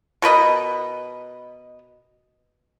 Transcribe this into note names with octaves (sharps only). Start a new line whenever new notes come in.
B2 A#4 B4 D#5